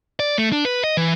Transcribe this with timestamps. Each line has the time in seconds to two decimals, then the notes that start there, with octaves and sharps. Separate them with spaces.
0.20 D5
0.38 A3
0.52 D4
0.65 B4
0.84 D#5
0.97 E3